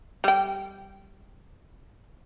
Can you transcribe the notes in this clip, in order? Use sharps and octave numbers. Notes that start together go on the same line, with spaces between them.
G3 G5